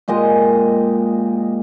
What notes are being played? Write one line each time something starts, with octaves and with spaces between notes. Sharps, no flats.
A#2 G#3 G4 D#5